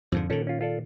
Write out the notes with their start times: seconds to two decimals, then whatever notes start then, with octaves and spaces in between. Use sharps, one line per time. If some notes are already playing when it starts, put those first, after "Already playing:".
0.12 F2 G#2 D3 F3
0.30 A#2 D#3 C#4 A4
0.47 C#4 F4
0.61 F4 A4 D5